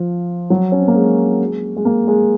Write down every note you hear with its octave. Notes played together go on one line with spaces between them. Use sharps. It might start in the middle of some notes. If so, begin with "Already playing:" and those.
Already playing: F3
F#3
C#4
C4
A#3
G#3
G#3
A#3
G#3